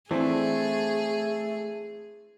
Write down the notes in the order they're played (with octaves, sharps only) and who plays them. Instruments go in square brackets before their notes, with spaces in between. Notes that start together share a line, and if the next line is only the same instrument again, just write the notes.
[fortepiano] E3 C4 D4 [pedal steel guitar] A3 [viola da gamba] G#4